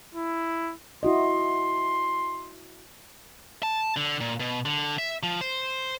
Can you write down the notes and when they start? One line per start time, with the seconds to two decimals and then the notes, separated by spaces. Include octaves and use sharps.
0.15 E4
1.03 E4 F#4 D#5 C6
3.63 A5
3.97 D3
4.21 A#2
4.40 B2
4.66 D3
4.98 E5
5.23 F3
5.41 C5